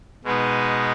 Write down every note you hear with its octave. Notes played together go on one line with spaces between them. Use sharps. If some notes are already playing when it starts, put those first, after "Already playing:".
B2 G#3 B3 D#4